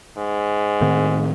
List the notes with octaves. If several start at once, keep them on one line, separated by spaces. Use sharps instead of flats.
G#2
A2 D#3 C4